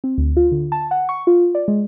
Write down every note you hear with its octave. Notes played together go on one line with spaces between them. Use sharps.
C4
D2
F4
D3
A5
F#5
C#6
F4
D5
G#3